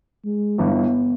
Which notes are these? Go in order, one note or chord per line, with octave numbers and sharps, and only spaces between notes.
G#3
G1 G2 E3 B3